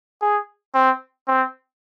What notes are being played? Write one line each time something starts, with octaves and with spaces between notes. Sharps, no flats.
G#4
C4
C4